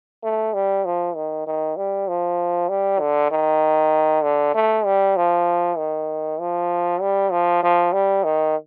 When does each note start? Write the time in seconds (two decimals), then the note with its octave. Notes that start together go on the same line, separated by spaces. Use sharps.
0.23 A3
0.54 G3
0.85 F3
1.16 D#3
1.47 D#3
1.77 G3
2.08 F3
2.69 G3
3.00 D3
3.31 D#3
4.23 D3
4.55 A3
4.85 G3
5.16 F3
5.78 D#3
6.40 F3
7.01 G3
7.31 F3
7.63 F3
7.93 G3
8.24 D#3